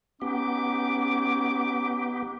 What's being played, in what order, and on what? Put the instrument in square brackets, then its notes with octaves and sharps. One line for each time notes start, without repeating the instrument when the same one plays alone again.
[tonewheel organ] B3 G4 [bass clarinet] C#4 [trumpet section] D#4 D6